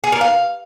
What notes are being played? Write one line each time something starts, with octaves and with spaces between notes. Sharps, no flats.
G#4
A#4
F5